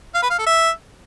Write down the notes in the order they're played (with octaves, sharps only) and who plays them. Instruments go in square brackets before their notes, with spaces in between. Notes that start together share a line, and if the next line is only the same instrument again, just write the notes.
[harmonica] F5
B4
F5
A4
E5